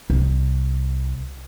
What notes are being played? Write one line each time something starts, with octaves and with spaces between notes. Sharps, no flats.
C2